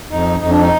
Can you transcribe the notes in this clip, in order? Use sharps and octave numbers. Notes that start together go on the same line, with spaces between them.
F2 D#4
F2 D#4
D4
D#4